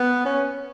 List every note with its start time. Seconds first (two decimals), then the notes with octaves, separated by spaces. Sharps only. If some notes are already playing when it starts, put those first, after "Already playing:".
Already playing: B3
0.25 C#4